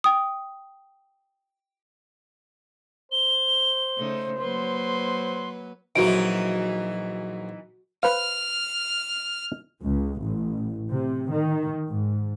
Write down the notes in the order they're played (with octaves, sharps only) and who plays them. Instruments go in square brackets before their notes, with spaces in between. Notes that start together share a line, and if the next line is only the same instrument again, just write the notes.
[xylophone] G5 D#6
[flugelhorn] C5 [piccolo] G7
[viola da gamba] C#3 A3 D#4
[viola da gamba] F#3 A#3 B4 [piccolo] C6
[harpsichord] A#1 F#3 [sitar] E3 D#4 [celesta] F#4 D7
[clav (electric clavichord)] B4 C5 F5 [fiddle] F6
[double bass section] C#2
A1
C3
D#3
G#2